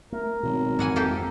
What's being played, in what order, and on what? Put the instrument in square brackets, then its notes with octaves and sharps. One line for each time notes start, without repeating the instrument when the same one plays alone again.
[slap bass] A3 [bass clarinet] A#4
[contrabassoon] G#1 [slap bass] B2 F#3
[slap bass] G#2 [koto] E3 F#5 G#5
[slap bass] F2 [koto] A#3 G4 A4